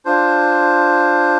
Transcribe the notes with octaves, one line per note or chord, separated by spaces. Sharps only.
D4 F4 C5